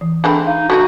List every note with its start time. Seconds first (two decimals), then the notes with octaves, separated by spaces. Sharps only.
0.01 E3
0.24 G#3 A3 C4 D4 B5
0.47 D#4 F5
0.70 D3 A3 D#4 F#4